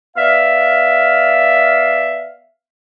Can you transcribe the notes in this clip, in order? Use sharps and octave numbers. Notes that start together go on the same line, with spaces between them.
B3 D5 E5 F5